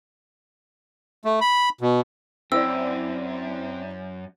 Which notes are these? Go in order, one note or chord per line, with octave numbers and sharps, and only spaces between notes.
A3
B5
B2
F#2 C4 E4 C5 D5 E6